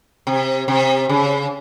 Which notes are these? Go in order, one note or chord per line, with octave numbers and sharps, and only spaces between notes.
C3
C3
C#3